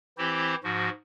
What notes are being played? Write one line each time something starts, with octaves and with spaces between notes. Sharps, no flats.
E3 C4 E4 G4 C5
G#2 F3 F#4